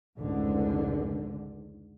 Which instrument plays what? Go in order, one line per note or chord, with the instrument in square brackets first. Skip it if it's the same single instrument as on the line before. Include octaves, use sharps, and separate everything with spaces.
[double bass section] F1 C#2 G#2 D3